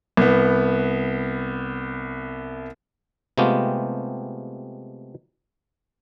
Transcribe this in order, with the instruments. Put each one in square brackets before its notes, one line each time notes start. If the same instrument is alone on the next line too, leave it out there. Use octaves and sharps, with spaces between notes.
[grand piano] C2 B3
[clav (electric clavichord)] C3 G#3 A3 B3 F4 G4